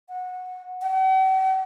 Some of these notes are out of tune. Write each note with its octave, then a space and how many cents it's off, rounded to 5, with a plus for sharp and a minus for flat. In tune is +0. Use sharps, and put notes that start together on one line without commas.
F#5 -15
F#5 +45